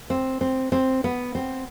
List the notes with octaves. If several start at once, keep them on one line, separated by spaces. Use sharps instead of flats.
C4
C4
C4
B3
C4